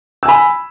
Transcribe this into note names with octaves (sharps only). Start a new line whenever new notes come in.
G#5 B5 E6